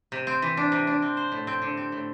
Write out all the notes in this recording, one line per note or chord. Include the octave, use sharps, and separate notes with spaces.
C3
C4
E3
D4
C3
D4
C4
C5
A2
C4
D3
C4
A2